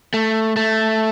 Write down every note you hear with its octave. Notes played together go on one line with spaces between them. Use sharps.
A3
A3